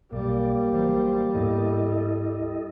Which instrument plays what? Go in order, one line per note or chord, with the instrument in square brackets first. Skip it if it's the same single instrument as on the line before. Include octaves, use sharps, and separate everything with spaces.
[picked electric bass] B1 [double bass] G3 [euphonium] A#3 [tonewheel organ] D5
[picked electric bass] A1 E3 F#3 [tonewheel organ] C5
[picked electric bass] D1 G#2 B3 [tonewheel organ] E4 A4 D#5